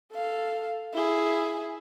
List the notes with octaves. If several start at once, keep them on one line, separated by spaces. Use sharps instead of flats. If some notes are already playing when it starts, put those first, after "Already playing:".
A4 F5
E4 G#4